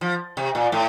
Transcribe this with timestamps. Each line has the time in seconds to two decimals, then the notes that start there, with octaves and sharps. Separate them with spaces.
0.01 F3
0.37 C3
0.55 A#2
0.72 A2